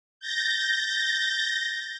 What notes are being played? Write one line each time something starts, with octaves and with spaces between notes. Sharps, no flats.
G6 A6 A#6